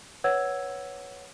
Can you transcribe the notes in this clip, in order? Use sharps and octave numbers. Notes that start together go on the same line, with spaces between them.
B4 C#5 F#5 E6 G#6